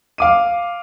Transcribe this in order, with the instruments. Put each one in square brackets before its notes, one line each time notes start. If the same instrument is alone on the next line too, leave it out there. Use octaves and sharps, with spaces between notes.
[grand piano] F5 D6 D#7